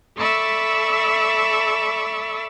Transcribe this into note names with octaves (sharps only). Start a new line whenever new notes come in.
A4 D5 E5 B5 C#6 E6